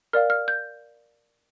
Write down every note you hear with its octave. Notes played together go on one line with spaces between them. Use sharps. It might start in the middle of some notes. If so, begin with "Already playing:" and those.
A#4 D5 F5 F6
F6
G6